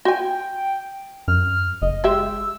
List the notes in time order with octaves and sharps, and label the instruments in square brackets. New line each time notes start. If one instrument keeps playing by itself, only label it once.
[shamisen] F#4 G#5 [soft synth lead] G5
[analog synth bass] F#2 [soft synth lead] F6
[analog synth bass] F#1 [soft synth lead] D#5
[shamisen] G#3 G4 E5 [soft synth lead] E6